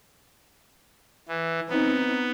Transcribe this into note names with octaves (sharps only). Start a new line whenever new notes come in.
E3
B3 C4 D#4